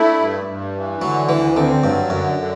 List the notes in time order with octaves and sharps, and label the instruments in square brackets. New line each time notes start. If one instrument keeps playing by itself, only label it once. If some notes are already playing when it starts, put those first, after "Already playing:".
Already playing: [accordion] A3 E4 [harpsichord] D4
[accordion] G2
G2
E3
[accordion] D3 [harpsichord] F#3
[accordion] D2 [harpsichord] E3
[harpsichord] D3 [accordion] C4
[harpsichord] G2 [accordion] F#3
[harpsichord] F#2 [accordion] D3
[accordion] D3